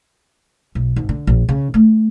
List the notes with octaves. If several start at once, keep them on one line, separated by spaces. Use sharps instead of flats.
B1
G#1
D3
A#1
C#3
A3